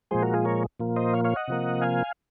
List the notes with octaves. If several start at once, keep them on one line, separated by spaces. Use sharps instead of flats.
A#2 F3 G#3 G#4 C5
F#4 A#4
F4 G#4
A#4 C#5
A#2 F3 A#3
C5 D#5
C#5 F5
C#5 F5
D#5 F#5
C3 F3 A#3
F5 G#5